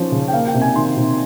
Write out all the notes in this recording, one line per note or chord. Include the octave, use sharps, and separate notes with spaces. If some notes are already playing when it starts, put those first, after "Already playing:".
Already playing: F3 C#4 C5
C#3
G5
A#3 F5
G5
C3
G#5
D#3 C6
C3